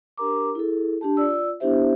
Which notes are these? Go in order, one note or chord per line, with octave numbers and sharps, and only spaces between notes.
D4 G4 A#4 A#5 D6
E4 G#4 A4
D4 G4 A5
F4 D5 E6
B3 D4 E4 G4 C5 E5